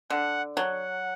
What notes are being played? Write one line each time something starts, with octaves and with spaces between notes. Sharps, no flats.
D3 F#5
F#3 F#5